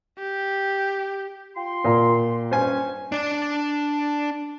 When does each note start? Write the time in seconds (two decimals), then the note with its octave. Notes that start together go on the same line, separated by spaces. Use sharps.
0.18 G4
1.56 F4 G5 C6
1.84 A#2
2.51 G2 C#4 C5 G#5
3.12 D4 D5